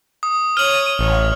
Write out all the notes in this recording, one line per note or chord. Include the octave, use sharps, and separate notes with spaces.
D#6
C#5 D#6 F6 F#7
A1 C#5